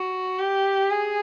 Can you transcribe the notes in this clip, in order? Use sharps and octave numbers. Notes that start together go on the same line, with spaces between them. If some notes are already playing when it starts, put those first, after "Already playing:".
Already playing: F#4
G4
G#4